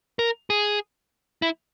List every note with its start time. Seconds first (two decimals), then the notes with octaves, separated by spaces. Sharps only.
0.19 A#4
0.50 G#4
1.42 E4